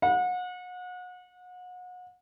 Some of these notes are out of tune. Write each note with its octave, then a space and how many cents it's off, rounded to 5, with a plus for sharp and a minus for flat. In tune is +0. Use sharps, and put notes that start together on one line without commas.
F#5 -35